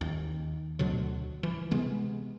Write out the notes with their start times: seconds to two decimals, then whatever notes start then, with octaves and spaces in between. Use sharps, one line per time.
0.01 D#2
0.79 D2 B2 D3 F#3
1.43 E3
1.71 C3 G#3 B3